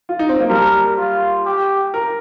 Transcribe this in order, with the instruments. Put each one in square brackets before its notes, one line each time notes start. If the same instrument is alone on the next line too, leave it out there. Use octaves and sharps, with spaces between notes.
[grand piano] F4
D#4
C4
A#3
[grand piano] G3 [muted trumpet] A#4
[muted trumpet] F4
G4
[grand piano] A#4